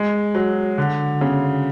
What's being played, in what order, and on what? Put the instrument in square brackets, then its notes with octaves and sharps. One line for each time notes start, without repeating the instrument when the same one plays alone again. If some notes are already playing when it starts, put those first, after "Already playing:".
Already playing: [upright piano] G#3
F#3
D3
C#3